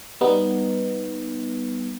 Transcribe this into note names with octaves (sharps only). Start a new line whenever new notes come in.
G3 B3 D#4